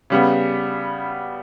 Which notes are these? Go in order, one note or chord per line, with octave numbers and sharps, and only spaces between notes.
C#3 G3 B3